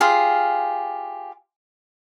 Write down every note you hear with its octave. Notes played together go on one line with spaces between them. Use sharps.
F4 G4 G#4 F5